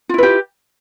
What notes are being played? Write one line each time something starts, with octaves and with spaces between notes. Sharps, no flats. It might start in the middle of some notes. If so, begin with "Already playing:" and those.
E4 F4 G4 B4